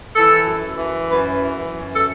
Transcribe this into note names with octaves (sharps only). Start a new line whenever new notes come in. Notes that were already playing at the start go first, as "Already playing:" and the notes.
E3 A4
F#2
E3
F#2 B4
E3
F#2
A4